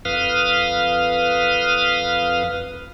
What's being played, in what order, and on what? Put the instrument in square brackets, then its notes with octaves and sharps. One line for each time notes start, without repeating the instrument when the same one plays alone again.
[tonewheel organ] F2 B4 F5 D#6 F6